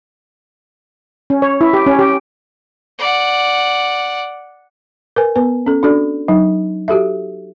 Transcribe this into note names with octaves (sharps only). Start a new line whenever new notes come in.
C#4
C#5
E4
G4
C#4
G4
D5 F#5
A#4 B4 G#5
B3 B4 G#5
C#4 A4
D4 F#4 A4 D5
F#3 D#4
F#4 G4 A4 E5